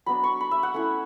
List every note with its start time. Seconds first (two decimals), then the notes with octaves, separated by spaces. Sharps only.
0.06 F#3 B3 D4 B5
0.24 C#6
0.41 B5
0.51 E5
0.63 F#5
0.74 A3 C#4 E4